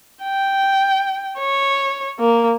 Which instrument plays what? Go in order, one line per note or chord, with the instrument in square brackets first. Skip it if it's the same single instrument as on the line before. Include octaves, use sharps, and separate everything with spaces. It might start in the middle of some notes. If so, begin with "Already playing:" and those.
[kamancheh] G5
C#5
A#3